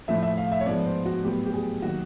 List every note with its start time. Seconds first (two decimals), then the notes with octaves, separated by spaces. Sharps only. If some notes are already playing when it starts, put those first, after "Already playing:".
0.08 A2 F3 A3 E5
0.23 E5
0.37 F5
0.52 E5
0.61 C#5
0.66 G#2 F3 G#3 B3 D5
0.86 C5
1.05 F#4
1.24 A2 F#3 B3 G4
1.46 G4
1.53 G#4
1.82 D#3 F#3 A#3 F#4